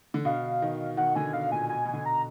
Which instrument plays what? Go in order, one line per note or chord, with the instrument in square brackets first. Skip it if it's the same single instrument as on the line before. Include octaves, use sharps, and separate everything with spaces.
[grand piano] D3
[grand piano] B2 [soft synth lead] F5
[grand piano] D#3
[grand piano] D#3 [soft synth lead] F#5
[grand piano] D3 [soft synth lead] G#5
[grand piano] B2 [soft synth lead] F5
[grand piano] A#2 [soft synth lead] G#5
[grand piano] B2 [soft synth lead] G#5
[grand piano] B2 [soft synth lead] G#5
[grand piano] D3
[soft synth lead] A#5